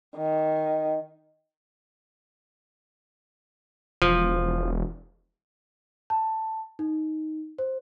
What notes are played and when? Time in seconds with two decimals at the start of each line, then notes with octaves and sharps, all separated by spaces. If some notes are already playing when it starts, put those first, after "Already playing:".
0.17 D#3
4.02 E1 F3
6.10 A5
6.79 D#4
7.59 C5